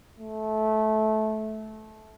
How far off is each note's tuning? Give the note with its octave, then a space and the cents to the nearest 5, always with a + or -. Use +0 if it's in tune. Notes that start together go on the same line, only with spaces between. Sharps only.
A3 -20